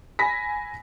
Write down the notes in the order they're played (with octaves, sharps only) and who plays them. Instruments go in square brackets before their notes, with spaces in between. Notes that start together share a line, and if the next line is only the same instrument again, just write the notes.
[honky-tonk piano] G#5 B5 A#6 B6